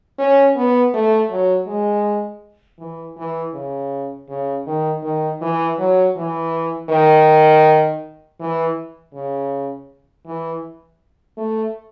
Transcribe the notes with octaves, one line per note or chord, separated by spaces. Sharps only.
C#4
B3
A3
F#3
G#3
E3
E3
C#3
C#3
D#3
D#3
E3
F#3
E3
D#3
E3
C#3
E3
A3